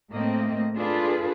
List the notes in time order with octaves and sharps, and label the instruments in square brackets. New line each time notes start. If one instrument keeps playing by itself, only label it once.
[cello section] A2 A3 A#3 C4 D#5
D4 F4 G#4 A4 B4